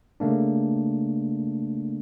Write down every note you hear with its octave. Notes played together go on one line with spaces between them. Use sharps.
C#3 A3 A#3 D4